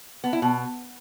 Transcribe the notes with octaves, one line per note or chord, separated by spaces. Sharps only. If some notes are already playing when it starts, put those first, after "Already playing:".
B3
E4
B2